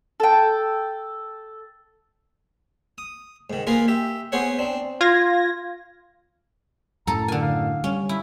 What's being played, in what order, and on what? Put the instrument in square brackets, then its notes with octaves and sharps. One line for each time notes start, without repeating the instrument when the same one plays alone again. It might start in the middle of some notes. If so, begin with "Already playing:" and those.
[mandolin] A4 G5
[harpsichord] D#6
G#2 D#3
A#3 F4 G#4 A#4 B4
G4 E5
B3 G#4 C5 C#5 F#5
C4 D4
[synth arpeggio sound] F4 G#6 A#6
[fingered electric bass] F#2 A2 [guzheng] A4 A5 [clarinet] A#5
[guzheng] D3 G#5 [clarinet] A#4
[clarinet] F5
[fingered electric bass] G3 [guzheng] C#4
[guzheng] E4